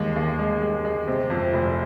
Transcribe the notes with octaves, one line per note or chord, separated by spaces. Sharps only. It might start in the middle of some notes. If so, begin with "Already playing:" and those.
Already playing: D#2 G#3
D#2
G#3
G#3
G#3
C3
F2
F1